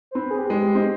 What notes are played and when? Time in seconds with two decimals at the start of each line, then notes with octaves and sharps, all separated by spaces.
0.11 C5
0.15 C4 B4
0.31 G#4
0.39 G4
0.50 G#3
0.62 G4
0.75 C4 D#5